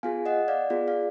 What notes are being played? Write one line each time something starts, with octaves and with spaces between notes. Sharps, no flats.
B3 F4 G#4 F5 G#5
D#5 F#5
D5 F5
B3 F4 G#4 D5
D5 F5